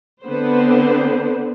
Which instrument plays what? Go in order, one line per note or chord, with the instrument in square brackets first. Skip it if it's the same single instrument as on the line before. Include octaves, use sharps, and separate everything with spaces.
[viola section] D3 B3 C4 B4 C5